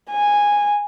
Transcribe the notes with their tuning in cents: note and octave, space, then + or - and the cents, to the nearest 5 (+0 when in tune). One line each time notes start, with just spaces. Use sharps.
G#5 -10